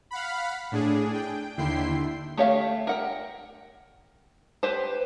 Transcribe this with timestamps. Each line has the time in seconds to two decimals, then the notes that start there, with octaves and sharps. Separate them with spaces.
0.11 F5 F#5 B5
0.72 A2 D4 G#4
1.13 G5
1.57 D#2 D3 E4 G5 C6 C7
2.37 A3 G4 C#5 E5 F5
2.87 A#4 F#5 G5
4.63 G4 B4 C5